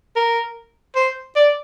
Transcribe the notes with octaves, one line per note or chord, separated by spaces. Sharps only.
A#4
C5
D5